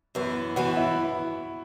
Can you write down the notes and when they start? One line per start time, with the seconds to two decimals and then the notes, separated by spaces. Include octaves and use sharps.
0.15 F#2 E3 B3
0.56 F#2 E3 B3 F#4
0.77 E4